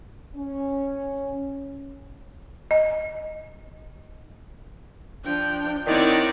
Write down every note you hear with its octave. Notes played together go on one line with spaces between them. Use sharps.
C#4
D#5
F3 D4 G5
D#3 C4 D#4 E4 F#4 C#5 D5